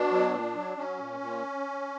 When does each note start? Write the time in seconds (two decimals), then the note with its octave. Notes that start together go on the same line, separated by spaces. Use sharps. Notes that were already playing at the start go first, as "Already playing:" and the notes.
Already playing: B2 D4
0.12 F#3
0.33 A#2
0.56 F#3
0.77 F#3 C#4
0.99 A#2
1.21 A#2